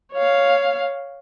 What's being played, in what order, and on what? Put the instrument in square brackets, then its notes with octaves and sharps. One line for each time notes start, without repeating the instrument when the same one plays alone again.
[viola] C#5 F5